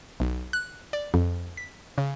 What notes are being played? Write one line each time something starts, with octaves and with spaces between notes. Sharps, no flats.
B1
F#6
D5
F2
B6
C#3